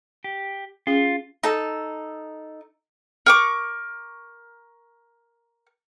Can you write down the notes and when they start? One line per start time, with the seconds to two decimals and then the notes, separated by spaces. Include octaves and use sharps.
0.24 G4
0.87 C#4 F4 G#4
1.43 D#4 A4
3.26 A#4 C#6 D6